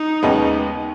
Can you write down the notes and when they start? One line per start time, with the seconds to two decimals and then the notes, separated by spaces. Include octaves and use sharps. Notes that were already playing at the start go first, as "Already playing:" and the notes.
Already playing: D#4
0.23 D#2 C#3 G#3 B3